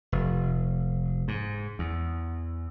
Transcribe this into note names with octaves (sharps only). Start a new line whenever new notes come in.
F1
G#2
E2